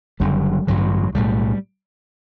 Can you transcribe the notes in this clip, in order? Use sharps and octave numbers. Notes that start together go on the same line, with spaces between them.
F#1 F#2 D3 G3
A1 G2 D3 F#3
B1 A2 G3